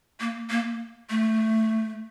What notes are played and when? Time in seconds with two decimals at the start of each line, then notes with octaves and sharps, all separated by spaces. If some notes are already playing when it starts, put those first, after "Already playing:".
0.20 A#3
0.50 A#3
1.10 A3